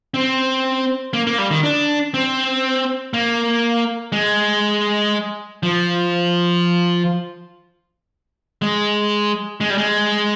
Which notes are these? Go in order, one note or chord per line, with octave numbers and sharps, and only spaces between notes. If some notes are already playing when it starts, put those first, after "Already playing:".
C4
A#3
A#3
G3
D#3
D4
C4
A#3
G#3
F3
G#3
G#3
G3
G#3